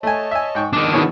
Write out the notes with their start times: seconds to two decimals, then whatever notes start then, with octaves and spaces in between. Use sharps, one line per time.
0.03 A3 C#5 D#5 G#5 A5
0.31 E5 G#5
0.55 G#2 G5 C#6
0.73 E2 D#3 G#3 D4 A5
0.93 B2 E3 F#4 G#4 B4 C#5